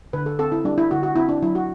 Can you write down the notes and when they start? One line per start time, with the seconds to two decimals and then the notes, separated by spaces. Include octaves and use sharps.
0.13 D3 B4
0.26 A4
0.39 C4 A4
0.52 E4
0.64 G3 D4
0.78 E4
0.91 D3 F#4
1.03 F#4
1.16 C4 E4
1.29 D4
1.43 F#3 E4
1.55 F#4